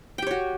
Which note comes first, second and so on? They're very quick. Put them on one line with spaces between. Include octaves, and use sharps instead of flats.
G5 G4 C#5 F#4